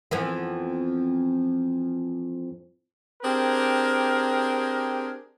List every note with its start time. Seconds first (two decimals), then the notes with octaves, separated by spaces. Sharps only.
0.11 F2 E3 B3
3.23 C4 D4 G4 G#4 A#4